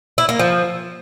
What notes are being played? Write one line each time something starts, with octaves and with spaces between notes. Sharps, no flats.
E4
A#3
F3